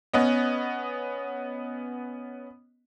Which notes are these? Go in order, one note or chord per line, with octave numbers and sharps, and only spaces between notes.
B3 C#4 D#5